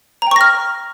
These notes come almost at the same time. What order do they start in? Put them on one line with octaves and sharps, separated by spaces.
A#5 G5 C#6 A#6 F6